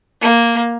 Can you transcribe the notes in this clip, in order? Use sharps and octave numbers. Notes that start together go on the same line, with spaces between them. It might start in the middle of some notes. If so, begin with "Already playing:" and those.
A#3